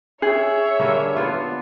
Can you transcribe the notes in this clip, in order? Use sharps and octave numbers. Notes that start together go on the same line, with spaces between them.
G#4 C#5 E5
D3 G3 A#3
D3 B3 F4